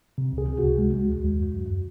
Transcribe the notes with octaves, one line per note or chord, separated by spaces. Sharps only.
C3
C#2
G#4
C3
C#2 F#4
G#3
G#3
D#2
D#2
F#2
F#2